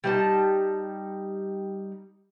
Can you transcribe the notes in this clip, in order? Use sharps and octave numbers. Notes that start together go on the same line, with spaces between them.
G3 D#4 A5